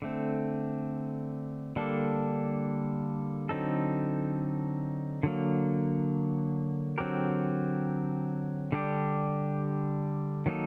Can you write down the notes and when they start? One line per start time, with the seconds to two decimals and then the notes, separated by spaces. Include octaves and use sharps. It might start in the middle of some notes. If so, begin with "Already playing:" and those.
0.02 D3 A3 C4
1.76 D3 G3 A#3 D4 A4
3.49 D3 F#3 C4 D#4 A4
5.23 D3 F#3 A#3
6.98 D3 F#3 C4 G4 A#4
8.72 D3 G3 D4 G4
10.46 D#3 F#3 A#3 D#4 A4